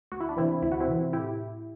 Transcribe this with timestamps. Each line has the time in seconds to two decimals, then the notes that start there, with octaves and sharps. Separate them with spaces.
0.12 D2 F#4
0.20 E4
0.29 D4
0.37 C3 E3 C4 E4
0.62 D2 E4
0.72 F#4
0.80 C4 E4
0.88 C3 E3
1.12 A2 E4 G4